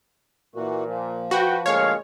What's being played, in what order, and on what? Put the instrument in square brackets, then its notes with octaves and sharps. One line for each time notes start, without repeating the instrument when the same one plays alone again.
[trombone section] A#2 [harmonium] E3 F#4
[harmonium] F3
[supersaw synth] F#4 [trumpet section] B4 G5
[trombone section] D2 A#2 G#3 [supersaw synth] C#5 [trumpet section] F5